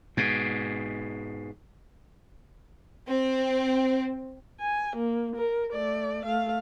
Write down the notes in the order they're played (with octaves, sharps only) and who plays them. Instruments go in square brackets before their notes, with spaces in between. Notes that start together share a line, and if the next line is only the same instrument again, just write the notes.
[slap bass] G#2 B2
[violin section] C4
[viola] G#5
A#3
A#4
A3 D5
A3 F5